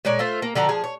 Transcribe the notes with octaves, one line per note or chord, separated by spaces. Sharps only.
A#2 G#3 C#5 D5
A3 F4 C5
A#3
D3 F3 F#4 A#5
F3 G#4
C#5